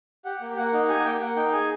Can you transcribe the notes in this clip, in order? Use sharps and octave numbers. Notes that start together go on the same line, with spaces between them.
G4 F#5
A#3
A#3 F#5
D#4 F#5
G4 G#5
F#5
A#3 G5
A#3 F#5
D#4 G5
G#4 G#5